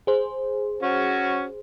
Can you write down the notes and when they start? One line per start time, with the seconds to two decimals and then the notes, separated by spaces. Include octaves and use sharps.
0.07 G#4 C5
0.83 C#4 F#4